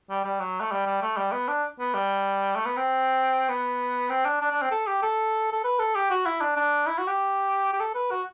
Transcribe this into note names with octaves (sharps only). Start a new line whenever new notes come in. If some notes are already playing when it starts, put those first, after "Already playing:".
G3
G3
F#3
A3
G3
G3
A3
G3
B3
D4
B3
G3
A3
B3
C4
B3
C4
D4
D4
D4
C4
A4
G4
A4
A4
B4
A4
G4
F#4
E4
D4
D4
E4
F#4
G4
G4
A4
B4
F#4